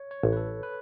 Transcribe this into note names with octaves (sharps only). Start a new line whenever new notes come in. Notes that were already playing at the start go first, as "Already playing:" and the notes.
Already playing: C#5
C#5
A1
B4
A4
B4